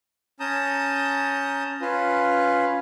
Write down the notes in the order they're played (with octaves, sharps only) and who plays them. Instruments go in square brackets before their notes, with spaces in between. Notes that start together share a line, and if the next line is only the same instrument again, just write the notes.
[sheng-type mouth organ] C#4 A5 A#5 D#6 G6
C#4 F4 B4